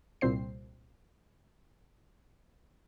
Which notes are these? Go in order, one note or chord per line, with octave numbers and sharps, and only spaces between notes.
C2 A#2 C4 C5 C7